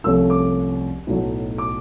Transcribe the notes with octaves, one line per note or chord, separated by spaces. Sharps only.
C2 C3 F3 A3 C#4 E6
D6
B1 A2 F#3
D6